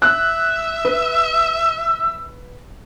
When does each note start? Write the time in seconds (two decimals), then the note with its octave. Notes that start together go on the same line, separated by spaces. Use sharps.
0.02 E5 E6 F#6
0.85 B4